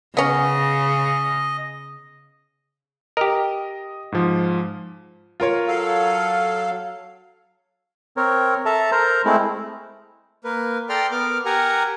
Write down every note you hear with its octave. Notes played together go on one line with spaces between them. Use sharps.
C#3 B3 C#4 D#5
G4 A#4 D#5
G#2 F3
F4 A#4 C#5
F#3 A4 F5
C4 A#4 C#5
A4 E5 A5 A#5
A#4 C5 A#5
G#3 A3 C4 E4
A#3 A#4 B4
A4 D5 G5 A#5 C6 F6
B3 A#4 D6 F6
G4 A#4 F#5 G#5 A#5